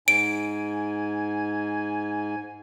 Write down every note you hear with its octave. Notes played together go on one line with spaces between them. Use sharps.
G#2 G#5 D7